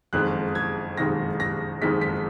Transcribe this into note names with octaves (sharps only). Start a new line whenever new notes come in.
F#1 F2 D#3 G#3 F#6
G#6
F#1 F2 D#3 G#3 A#6
A#6
F#1 F2 D#3 G#3 B6
B6